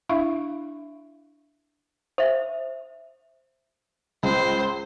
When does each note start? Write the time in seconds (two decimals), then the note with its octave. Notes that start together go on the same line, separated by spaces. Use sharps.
0.09 D4 E4 E5 F5 C#6
2.18 C5 E5
4.23 C#2 C5